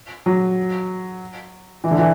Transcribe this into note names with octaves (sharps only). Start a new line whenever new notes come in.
F#3
E3
D3
E3